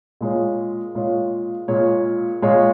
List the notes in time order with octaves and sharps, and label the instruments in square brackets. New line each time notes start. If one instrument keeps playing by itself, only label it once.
[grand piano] A#2 G#3 F4 C#5
A#2 G#3 F4 C#5
A#2 G#3 F4 C#5
A#2 G#3 F4 C#5